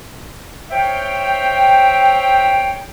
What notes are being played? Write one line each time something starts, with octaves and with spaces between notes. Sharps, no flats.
C5 C#5 E5 F5 G5